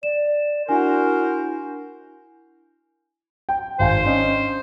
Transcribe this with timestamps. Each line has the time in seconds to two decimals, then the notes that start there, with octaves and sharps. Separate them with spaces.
0.03 D5 E7
0.69 D4 E4 F#4 A#4 C5 G#5
3.49 G5
3.79 G#1 C5 F5 G#5
4.05 C#4 D4 D#5